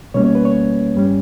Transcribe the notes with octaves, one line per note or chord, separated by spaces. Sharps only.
B2 G3 A#3 C#4 C#5
C#5
B4
C#5
G2 G3 C#4